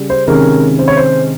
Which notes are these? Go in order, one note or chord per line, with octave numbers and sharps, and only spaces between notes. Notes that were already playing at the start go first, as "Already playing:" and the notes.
Already playing: C#3 G3 C#4
C5
C3 D#3 G#3 C#4 A#4
C5
C#5
C5